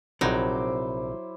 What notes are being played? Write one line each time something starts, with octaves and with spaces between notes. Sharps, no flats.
A#1 C3 F#3 D#4 E4 C5 G5 D6